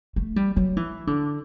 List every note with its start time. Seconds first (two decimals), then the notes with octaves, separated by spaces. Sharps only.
0.16 A3
0.36 G3
0.56 F#3
0.77 E3
1.07 D3